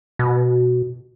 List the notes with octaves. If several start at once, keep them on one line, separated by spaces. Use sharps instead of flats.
B2